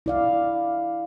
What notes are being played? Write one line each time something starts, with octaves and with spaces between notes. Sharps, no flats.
E4 D5 F5